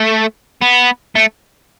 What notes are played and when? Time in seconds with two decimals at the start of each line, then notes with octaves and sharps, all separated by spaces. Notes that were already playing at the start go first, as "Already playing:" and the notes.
Already playing: A3
0.62 B3
1.15 A3